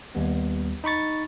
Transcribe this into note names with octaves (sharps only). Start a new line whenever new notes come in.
D#2 G3 B3
D#4 B5 C#6 A6